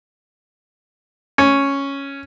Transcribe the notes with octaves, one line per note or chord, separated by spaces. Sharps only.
C#4